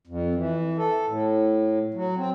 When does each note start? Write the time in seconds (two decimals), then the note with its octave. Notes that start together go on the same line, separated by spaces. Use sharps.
0.07 F2
0.35 E3
0.77 A4
1.07 A2
1.94 F#3
2.17 C4